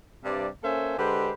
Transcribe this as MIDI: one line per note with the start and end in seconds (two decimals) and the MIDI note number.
0.24 0.48 43
0.24 0.48 48
0.24 0.48 74
0.63 0.97 58
0.63 0.97 61
0.63 0.97 69
0.63 0.97 72
0.63 0.97 76
0.63 0.97 80
0.98 1.31 50
0.98 1.31 56
0.98 1.31 67
0.98 1.31 71
0.98 1.31 72